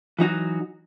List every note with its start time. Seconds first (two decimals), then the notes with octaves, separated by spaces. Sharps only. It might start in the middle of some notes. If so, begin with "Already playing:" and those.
0.19 E3 F#3 D#4 F#4